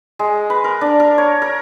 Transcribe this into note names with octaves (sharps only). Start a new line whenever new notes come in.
G#3
B4
A#4
D4
A#4
C#5
A#4